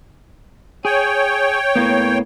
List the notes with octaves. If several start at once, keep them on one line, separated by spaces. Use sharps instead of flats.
G#4 C#5 G5
A2 A#3 B3